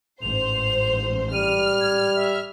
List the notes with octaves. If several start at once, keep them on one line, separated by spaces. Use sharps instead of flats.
A1 G#2 C5 F7
G3 F6 D#7
G#6
E5